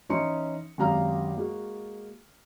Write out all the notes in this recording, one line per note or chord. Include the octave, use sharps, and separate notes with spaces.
E3 C#4 D#4 C6 C#7
G#1 F#2 G4 F5 A#5 F6
G#3 A#3 F#4